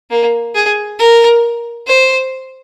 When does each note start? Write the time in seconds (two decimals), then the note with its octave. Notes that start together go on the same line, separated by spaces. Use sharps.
0.10 A#3
0.55 G#4
0.99 A#4
1.87 C5